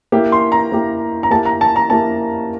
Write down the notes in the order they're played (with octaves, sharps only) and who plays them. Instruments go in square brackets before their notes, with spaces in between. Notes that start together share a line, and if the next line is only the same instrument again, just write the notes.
[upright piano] A#3 E4 G4
[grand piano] C6
A#5
[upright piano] A#3 E4 G4
[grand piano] A#5
[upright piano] A#3 E4 G4 [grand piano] A5
[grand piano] A#5
A5
A#5
[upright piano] A#3 E4 G4 [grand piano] A5